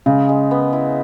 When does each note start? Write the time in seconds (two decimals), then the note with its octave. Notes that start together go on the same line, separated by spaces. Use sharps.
0.06 C#3 G#3
0.29 G#3
0.51 B3
0.73 E4